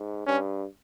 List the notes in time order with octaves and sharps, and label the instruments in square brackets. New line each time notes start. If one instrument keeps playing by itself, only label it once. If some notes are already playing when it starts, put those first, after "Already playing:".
Already playing: [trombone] G#2
[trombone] G2 [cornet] C#4